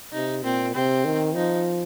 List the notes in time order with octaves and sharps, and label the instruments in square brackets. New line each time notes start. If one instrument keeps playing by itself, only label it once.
[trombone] C3 [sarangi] D#4
[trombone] A#2 [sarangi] C4
[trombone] C3 [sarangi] C4
[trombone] D#3
[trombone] F3 [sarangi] D#4